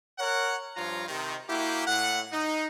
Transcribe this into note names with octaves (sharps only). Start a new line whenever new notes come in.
A#4 C#5 F#5
G2 F3 F4 C#5 A#5
C3 D#3
A#3 E4 F#4 G4
A2 F#5
D#4